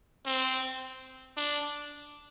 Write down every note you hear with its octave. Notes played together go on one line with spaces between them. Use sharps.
C4
D4